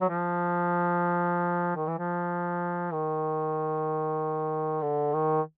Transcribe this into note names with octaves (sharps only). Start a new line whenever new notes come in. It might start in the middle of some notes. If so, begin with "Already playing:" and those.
F#3
F3
D#3
E3
F3
D#3
D3
D#3